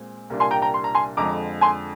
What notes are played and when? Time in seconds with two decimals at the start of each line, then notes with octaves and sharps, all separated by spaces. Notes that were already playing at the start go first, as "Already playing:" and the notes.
Already playing: A#2 G#3 C4
0.30 C2 A#2 G3 A#3 D4
0.40 G#5 C6
0.51 G5 A#5
0.62 G5 A#5
0.74 C6
0.84 A#5
0.95 G#5 C6
1.17 F2 D3 F3 G#3 A#5 D6
1.61 G#5 C6